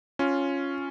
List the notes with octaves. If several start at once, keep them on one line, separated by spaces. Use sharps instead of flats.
C#4 F4